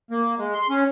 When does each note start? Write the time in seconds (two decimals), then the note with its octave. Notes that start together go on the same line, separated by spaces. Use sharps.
0.11 A#3
0.38 G#3
0.54 C6
0.69 C#4